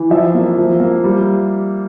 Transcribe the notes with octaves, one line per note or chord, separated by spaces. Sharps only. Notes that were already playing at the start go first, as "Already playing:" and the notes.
Already playing: E3
F3 E5
A#3
F3
A#3
G3